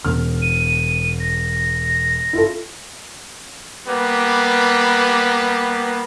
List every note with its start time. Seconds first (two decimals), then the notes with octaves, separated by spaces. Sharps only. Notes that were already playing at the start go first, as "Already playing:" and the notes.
0.05 E1 F6
0.42 D#7
1.20 A#6
2.33 E4 F4 A4
3.87 G3 A#3 B3 B4